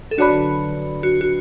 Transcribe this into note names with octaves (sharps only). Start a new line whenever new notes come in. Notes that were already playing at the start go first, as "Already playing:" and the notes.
A4
D3 F#3 D4 F#4 B4
F#4
F#4